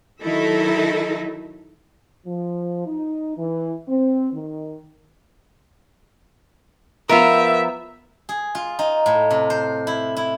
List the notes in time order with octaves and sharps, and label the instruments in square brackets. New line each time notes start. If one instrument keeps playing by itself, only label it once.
[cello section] D#3 F#3 D#4 E4 A4 E5
[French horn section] F3
D#4
E3
C4
D#3
[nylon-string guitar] F3 B3 [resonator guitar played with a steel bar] F4 A#4 [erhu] E5
[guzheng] G#4
F4
D#4
A2
C3
C5
E4
E4